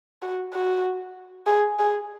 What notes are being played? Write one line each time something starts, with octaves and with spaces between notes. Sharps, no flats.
F#4
F#4
G#4
G#4